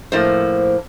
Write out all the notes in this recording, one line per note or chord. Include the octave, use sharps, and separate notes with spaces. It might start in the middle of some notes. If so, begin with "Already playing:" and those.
A2 F3 A#3 C5